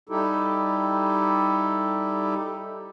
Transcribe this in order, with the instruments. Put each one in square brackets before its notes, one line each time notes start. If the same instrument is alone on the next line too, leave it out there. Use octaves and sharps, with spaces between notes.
[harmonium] G3 D#4 E4 G4 A4